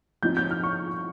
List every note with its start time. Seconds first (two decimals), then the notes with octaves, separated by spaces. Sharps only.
0.23 F3 C4 D#4 G6
0.37 G6
0.51 F6
0.63 C#6